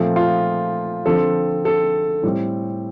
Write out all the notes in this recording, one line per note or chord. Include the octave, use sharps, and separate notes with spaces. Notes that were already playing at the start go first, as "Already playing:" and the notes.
Already playing: A#2 F3 A3 C4
F4
D3 F3 C4 A4
A4
A2 G3 C4